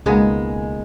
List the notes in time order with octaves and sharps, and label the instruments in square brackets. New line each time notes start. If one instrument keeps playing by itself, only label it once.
[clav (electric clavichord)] C#2 B2 A#3 D#4 [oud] G#3 B3